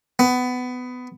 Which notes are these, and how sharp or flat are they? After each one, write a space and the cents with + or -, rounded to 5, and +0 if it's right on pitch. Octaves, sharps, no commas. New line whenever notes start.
B3 +20